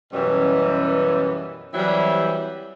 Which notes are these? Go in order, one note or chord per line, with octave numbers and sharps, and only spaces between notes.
F#2 B2 E3 G3 C#4
E3 F#3 G3 C4 E4